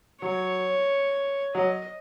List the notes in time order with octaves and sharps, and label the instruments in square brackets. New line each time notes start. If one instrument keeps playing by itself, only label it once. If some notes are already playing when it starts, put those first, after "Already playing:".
[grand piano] F#3 [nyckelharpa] C#5
[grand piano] F#3 [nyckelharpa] D#5